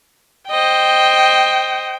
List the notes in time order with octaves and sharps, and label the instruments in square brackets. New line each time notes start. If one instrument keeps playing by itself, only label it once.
[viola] C5 D#5 [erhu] G5